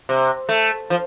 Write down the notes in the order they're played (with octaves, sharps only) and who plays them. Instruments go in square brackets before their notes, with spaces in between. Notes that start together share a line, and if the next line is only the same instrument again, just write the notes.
[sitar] C3
A3
F3